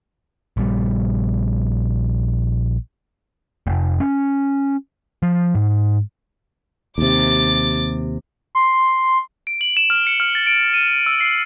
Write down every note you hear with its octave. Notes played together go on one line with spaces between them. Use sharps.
A#1 G3
F1
C#4
F3
G#2
D#2 C3 D6 A6
C6
D7
F#7
E7
F6
C#7
F6
A6
D7
D#7
E7
E6
C7